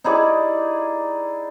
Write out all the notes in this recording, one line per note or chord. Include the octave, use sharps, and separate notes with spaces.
D#4 E4 G#4 D5